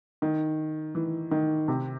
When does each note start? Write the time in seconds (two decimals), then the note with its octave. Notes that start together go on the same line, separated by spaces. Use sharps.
0.22 D#3
0.95 E3
1.31 D#3
1.68 C3